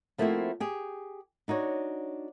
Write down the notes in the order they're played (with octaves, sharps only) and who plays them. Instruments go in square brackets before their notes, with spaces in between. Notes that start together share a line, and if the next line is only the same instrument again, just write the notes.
[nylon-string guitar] F3 A3 A#3 C4 E4 F#4
G4 G#4
D4 D#4 F#4 C#5